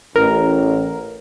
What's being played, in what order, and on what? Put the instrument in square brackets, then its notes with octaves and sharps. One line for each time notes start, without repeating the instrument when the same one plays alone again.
[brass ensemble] A1 [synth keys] A#4